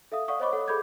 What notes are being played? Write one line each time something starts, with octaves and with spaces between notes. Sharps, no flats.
A4 E5 F5 D#6
D5 F5 F#5 C#6 D#6
C5 C#5 D#5 B5 C#6 D6
A4 C#5 F#5
G#4 A4 B5 D6 G6 G#6